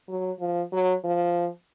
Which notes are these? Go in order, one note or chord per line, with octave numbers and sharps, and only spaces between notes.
F#3
F3
F#3
F3